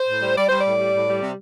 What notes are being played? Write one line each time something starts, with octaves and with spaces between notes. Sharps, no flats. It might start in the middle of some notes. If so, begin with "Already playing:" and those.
Already playing: C5
A2
G3
G3 D5
G3 C5
D5
A2
G3
A2
G3
C3